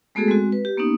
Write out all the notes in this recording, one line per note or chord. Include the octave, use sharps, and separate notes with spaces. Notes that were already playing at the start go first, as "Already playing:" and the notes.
G#3 A3 B3 F#4 G#4 A4
G#3 C4 F#4
B4
G4
A#3 B3 C#4 D#4